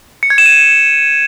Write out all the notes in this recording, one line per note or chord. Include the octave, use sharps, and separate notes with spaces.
C#7
G#6
E7
D#7